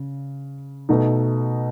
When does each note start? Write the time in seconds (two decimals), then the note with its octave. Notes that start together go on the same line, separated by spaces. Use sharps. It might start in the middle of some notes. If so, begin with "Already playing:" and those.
Already playing: C#3
0.89 B2 A3 D#4